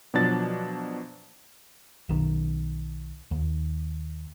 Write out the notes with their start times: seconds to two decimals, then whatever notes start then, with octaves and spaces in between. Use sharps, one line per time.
0.14 B2 F3 F#3 D4 A6
2.09 B1 D#3
3.31 D#2